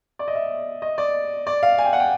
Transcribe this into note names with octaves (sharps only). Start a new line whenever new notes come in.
D5
D#5
E5
D#5
D5
D5
F5
G#5
G5
F#5
G5